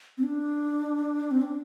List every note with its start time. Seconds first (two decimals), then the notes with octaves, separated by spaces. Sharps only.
0.18 C4
0.23 D4
1.31 C4
1.42 D4